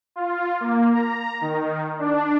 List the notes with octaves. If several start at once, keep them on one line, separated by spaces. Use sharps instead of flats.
F4
A#3
A#5
D#3
D4